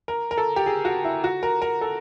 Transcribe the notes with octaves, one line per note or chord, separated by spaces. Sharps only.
A#4
A#4
A4
G4
G#4
F#4
E4
F#4
A#4
A#4
A4